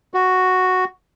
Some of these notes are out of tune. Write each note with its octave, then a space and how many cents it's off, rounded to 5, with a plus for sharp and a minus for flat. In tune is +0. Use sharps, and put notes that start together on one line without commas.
F#4 +0